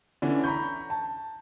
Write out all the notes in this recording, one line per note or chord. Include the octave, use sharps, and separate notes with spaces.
D3 E3 C#4 D4
A#5 B5 C#6 G6
A5